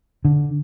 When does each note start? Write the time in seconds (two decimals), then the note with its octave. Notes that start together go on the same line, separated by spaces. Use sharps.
0.25 D3